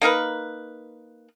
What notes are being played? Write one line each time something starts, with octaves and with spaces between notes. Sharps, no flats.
A#3 D#4 A#4 B4